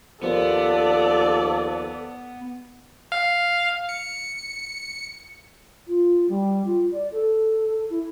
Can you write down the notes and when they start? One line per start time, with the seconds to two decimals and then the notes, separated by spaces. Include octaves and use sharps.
0.23 D#2 F3 B3 A4 D5
3.12 F5
3.89 C#7
5.88 F4
6.29 G3
6.65 F4
6.92 D5
7.12 A4
7.90 E4